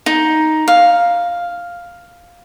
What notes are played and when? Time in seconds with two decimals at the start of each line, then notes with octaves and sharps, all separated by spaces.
0.06 D#4
0.68 F5